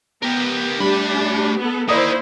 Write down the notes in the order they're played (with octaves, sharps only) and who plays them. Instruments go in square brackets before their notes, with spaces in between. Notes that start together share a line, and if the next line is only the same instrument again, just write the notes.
[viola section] B3 [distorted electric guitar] G4 A#4
[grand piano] G3 [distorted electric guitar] A3 B5 [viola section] D4 G4
[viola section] B3 A4
[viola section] A#3 E4 C5 [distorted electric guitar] D#4 A#4 [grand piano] D5 D#6